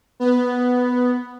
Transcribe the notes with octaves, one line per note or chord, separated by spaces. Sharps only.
B3